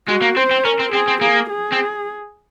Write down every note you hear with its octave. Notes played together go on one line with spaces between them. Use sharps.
G#3 F#4
A#3
C4 C5
C4
C#4 A#4
C4
C4 G#4
C4
A#3 G#4
G#4
C4